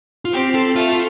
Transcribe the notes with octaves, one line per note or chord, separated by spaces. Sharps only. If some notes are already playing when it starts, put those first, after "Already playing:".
F4
C4 G4
A4
A3 F4
F4